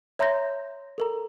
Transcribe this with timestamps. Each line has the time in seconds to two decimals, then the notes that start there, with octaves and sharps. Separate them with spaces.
0.19 C#5 E5 A#5 C6 G6 A#6
0.98 A4 A#4 A#5